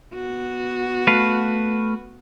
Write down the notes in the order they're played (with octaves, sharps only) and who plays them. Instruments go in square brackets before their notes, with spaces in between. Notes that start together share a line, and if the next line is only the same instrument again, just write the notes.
[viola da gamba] B3 F#4
[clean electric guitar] A3 B4 F5